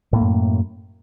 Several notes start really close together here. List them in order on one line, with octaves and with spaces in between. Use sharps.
A2 A#3 A3 F#2